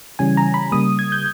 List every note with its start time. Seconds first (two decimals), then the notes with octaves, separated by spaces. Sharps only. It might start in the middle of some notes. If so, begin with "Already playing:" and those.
0.19 C#3 E3 G3 C#4 G#5
0.37 A#5
0.54 B5
0.72 C#3 G3 A#3 D#6
0.99 G#6
1.12 G6